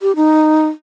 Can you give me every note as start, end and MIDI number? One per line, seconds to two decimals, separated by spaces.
0.02 0.15 67
0.16 0.67 63